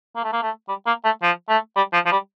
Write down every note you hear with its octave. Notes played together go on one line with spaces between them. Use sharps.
A#3
A3
A#3
A3
G3
A#3
A3
F3
A3
G3
F3
F3
G3